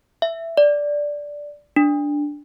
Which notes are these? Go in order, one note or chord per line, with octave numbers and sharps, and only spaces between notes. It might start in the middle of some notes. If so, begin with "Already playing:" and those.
E5
D5
D4